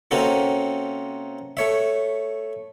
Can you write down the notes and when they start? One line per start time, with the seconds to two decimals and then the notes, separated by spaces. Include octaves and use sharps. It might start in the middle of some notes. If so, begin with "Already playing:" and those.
0.11 C3 A#3 C4 C#4 F#4 A4
1.57 A3 C#5 E5